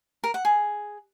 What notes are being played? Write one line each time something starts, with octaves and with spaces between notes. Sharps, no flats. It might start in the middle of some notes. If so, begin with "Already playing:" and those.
A#4
F#5
G#4